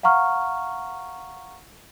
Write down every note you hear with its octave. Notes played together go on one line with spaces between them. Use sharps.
F5 F#5 A#5 C#6 F6